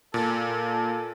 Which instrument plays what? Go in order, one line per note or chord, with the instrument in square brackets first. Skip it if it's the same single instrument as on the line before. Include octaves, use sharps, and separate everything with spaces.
[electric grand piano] A#2 [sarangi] A4